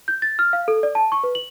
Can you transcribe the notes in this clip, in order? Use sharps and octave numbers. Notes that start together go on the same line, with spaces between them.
G6
A6
F6
F5
A4
D5
A5
C#6
B4
F#7